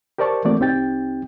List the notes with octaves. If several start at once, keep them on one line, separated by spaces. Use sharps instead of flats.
G4 A#4 C5 D5 A5 C#6
E3 A3 A#3 C4 F#4 D5
C2 C4 D#4 G4 G5 A6